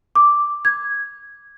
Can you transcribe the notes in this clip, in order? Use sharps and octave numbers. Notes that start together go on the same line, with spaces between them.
D6
G#6